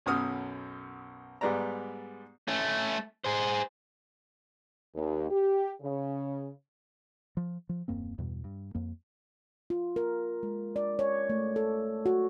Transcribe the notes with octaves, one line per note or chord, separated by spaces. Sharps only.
B1 F#2 B2 D#6 F6
G#2 G3 B3 D5 A#5
A3 C#4
G#4 C5
D#2
G4
C#3
F3
F3
D#1 F#2 A#3 C4
E2 G2 B2
G2
F2 A#3
F4
A#4
G#3
D5
C#5
A3
A4
F#4